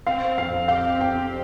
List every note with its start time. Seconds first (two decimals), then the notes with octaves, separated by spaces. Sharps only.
0.07 C4 F5
0.38 F2 F5
0.68 G4 F5
1.00 F2 G5